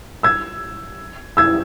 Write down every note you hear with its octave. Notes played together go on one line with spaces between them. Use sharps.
E6 G#6
E6 G#6